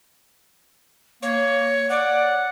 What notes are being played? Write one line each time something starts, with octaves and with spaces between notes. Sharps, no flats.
A#3 C#5
D5 F#5